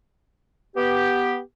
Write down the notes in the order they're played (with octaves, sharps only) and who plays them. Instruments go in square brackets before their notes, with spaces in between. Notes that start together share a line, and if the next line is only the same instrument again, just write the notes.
[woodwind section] B3 G4